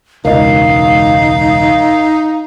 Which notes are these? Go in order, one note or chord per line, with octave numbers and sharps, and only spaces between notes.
E1 C#2 D#4 A#4 D#5 F5